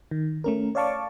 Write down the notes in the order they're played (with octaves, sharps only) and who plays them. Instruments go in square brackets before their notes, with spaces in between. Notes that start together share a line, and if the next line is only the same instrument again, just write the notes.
[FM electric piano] D#3
A3 C#4 A#4
C#5 D5 F5 A5 C#6 D6